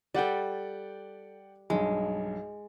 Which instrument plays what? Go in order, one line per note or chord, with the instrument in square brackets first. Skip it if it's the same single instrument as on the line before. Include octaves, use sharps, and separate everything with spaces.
[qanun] G3 A4 [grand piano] D5 F#5 G5
[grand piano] B1 G2 [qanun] G#3